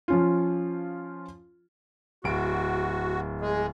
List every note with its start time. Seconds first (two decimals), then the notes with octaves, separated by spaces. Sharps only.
0.08 F3 C#4 F4
2.24 D1 F#4 D7
3.41 G#3